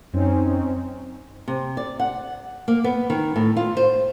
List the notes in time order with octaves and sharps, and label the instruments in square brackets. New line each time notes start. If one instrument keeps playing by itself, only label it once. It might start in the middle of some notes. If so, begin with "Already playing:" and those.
[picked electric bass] F#2 [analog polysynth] C4 C#4 D#4
[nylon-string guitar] C3
D5
F#5
A#3
B3
D#3
A2
F4
C5